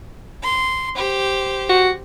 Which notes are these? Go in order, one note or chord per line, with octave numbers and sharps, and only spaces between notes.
C6
G4 C5
F#4